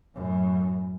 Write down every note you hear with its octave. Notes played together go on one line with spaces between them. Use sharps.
F#2 A2